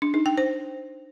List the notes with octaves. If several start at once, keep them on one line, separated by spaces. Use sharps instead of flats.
D4
D#4
G5
C5